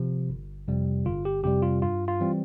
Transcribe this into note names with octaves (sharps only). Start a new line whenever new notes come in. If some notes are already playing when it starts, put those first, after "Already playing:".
Already playing: C3 F3
G1
F2 C3 G3
G1 F4
G4
F2 C3 G3 G4
F4
G2 F4
F4
E3 G3 C4